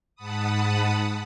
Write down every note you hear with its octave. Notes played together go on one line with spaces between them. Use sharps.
G#2 F#5 A5 B5 D#6